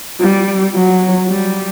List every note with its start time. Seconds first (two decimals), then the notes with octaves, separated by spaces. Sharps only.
0.20 G3
0.75 F#3
1.29 G3